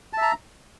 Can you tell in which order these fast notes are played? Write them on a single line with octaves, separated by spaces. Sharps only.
A5 E5 A#5